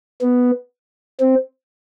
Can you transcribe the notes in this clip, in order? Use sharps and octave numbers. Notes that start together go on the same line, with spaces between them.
B3
C4